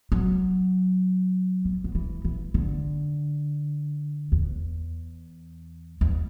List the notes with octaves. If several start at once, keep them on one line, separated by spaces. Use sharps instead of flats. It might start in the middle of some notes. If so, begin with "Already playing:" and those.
F#3
E3
F#3
E3
E3
D3
E2
E2